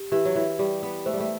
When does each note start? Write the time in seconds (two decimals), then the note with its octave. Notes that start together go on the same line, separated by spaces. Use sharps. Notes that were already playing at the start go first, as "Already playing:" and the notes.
Already playing: G4
0.12 E3 G4
0.25 F#3
0.36 E3
0.59 G3 G4
0.83 B3
1.06 A3 C5
1.14 G3
1.20 A3